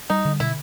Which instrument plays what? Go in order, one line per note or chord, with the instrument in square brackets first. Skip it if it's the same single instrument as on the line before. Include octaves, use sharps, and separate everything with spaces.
[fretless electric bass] G3 [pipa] D#4
[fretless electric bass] D3
[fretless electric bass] B2 [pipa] E4